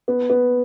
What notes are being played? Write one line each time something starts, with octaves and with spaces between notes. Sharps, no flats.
B3
B3